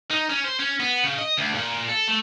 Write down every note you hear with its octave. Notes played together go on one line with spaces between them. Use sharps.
D#4
C#4
C5
C#4
B3
C#3
D#5
D2
A#2
A4
A3